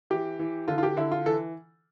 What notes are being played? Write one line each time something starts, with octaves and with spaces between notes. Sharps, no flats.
E3 G4
E3
D3 F4
F4
G4
D3 E4
F4
E3 A4